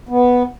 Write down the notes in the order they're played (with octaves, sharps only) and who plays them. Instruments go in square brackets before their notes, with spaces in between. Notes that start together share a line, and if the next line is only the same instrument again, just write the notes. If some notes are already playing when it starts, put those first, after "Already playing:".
[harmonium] B3